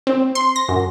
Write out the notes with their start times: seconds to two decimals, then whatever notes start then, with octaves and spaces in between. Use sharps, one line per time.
0.07 C4
0.35 C6
0.56 A#6
0.68 F#2